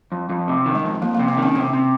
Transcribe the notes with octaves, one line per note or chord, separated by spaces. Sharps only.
F2
F2
C3
D#3
G#3
F2
F2 A#3
A#3
C3
C4
D#3
C#4
C3 C4
C3